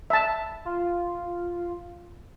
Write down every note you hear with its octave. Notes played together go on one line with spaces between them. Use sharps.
E5 A5
F4